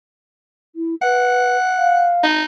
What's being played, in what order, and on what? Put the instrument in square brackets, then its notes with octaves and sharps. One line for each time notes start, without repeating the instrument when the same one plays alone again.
[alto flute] E4
[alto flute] B4 [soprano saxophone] F#5
[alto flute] F5
[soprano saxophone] D#4